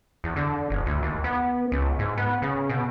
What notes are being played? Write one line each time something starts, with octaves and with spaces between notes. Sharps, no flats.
E2
D3
F#1
D2
D#2
B3
C#2
G#2
B3
C#3
B2